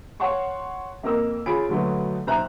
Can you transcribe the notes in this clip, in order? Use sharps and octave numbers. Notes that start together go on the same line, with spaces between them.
C#5 F5 F#5 A5 C6 C#6
F2 A#3 A#4 D#5 E6
C#3 F4 G#4 B5 D7
B2 D3 F#3 A3 B3
B1 C5 E5 A#5 F#6